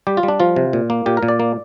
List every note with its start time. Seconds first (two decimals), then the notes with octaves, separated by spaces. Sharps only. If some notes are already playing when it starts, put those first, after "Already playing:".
0.07 G3 G4
0.17 F4
0.23 G3
0.28 D4
0.40 F3 F4
0.56 C3
0.73 A#2
0.90 A#3
1.06 A#2 G4
1.17 A#4
1.23 A#2
1.28 D5
1.40 A#3